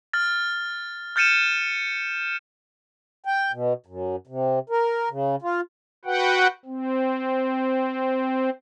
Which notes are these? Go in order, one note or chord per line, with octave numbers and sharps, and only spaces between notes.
F6 A6
F6 G6 A6 C#7 D#7 E7
G5
B2
F#2
C3
A#4
C#3
F4
F#4 B4 F#5 G5
C4